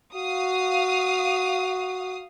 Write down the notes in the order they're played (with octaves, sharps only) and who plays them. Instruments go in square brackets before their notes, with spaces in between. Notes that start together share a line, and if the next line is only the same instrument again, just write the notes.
[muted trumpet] F#4 [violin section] F5 D#6